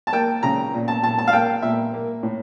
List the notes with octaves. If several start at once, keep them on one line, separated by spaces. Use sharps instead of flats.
A5
A#3 G5
C#3 A#5
A#2
A5
A#2 A5
A5
F5
A#3 G5
A#2 E5
A#3
A2